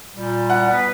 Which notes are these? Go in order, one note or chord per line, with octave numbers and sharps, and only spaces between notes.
A#2 G3
F#5
B3 B4